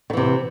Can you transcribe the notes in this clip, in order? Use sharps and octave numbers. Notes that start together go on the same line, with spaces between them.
C3 D#3 E3